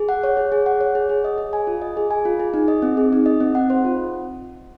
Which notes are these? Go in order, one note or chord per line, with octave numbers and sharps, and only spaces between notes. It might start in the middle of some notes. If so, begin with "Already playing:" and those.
Already playing: G#4
F#5
C#5
G#4
G#4
F#5
C#5
G#4
G#4
D#5
G#4
G#5
F4
D#5
G#4
G#5
F4
G#4
D#4
D#5
C4
G#4
D#4
D#5
C4
F#5
C5
F4